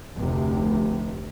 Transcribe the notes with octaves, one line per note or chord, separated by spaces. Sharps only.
F1 D2 C3